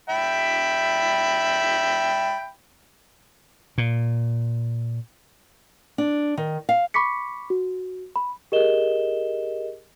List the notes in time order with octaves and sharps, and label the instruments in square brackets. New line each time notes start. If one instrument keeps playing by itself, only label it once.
[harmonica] E5 G5 B5
[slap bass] A#2
[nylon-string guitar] D4
D#3
F5
[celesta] B5 C#6 D6 B6 C#7
F#4
B5
G4 G#4 A#4 D#5 E7 G7